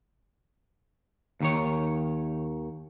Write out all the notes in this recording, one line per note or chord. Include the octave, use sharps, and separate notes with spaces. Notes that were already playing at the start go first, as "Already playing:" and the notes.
D#2 D#3 C#5